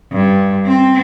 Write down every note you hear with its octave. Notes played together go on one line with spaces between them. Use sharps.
G2
C4